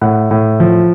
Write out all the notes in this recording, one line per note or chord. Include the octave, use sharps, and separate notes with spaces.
A2 F#5
A2
F3